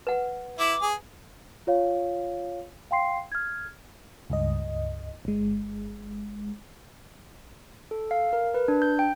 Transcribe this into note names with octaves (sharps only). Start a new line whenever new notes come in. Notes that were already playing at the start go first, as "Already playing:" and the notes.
B4 F#5
E4 D6
G#4
F4 C#5 F5
F5 G5 C6 C7
F6 G#6
C#2 G2 D#5
G1 G#3
A4
F5
A#4
B4
D4
G6
G5